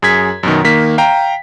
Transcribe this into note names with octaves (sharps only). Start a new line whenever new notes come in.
F#2 G#4 G#6 B6
F#2 B2 D#3
D#3 A#3 B6
F5 G5 A#5